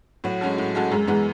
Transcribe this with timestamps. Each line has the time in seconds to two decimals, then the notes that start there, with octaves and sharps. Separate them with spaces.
0.24 A2 F#3
0.41 G#3 C#4 F#4 A4
0.58 A2
0.75 G#3 C#4 F#4 A4
0.91 F#2 G#3
1.07 E3 G#3 B3